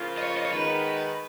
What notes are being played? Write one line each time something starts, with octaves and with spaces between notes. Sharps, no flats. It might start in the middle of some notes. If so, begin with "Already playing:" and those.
Already playing: C#3 F3 A#3 F4
D#5
C#5
D#5
C#5
D#3 G#3 B3 B4